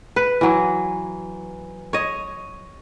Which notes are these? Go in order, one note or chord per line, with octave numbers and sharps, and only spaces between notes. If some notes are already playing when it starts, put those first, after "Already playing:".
B4
E3 F#3
C#5 D#5